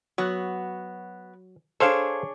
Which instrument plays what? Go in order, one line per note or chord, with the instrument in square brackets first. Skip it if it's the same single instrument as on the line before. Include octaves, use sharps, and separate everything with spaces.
[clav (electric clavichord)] F#3 [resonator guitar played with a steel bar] B3 F#4
[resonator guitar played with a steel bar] D4 G#4 C#5 [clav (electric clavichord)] A4 C5 F5